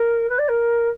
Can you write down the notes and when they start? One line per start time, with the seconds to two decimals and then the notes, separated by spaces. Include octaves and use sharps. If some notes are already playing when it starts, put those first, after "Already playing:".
Already playing: A#4
0.29 B4
0.38 D5
0.48 A#4